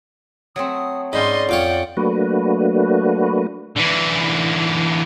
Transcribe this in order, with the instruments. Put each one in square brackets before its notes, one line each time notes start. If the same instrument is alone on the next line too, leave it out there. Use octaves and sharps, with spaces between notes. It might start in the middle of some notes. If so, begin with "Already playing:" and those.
[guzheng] F#3 A3 C4 [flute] D#6
[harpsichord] G#2 [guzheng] C#4 C5 B5 [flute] D5 [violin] D#5 C6
[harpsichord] F2 F4 C#5 [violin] F#5 G5
[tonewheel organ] F#3 A3 A#3 D4 F#4 B4
[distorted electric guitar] D3 E3